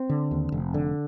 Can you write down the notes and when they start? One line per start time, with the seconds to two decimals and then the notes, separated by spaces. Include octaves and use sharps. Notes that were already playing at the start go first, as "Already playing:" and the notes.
Already playing: C4
0.09 D3
0.31 D#2
0.52 F1
0.74 D3